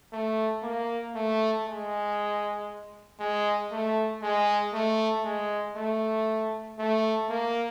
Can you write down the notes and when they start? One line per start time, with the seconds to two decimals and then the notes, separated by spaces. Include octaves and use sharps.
0.13 A3
0.63 A#3
1.15 A3
1.67 G#3
3.20 G#3
3.72 A3
4.23 G#3
4.74 A3
5.25 G#3
5.77 A3
6.79 A3
7.30 A#3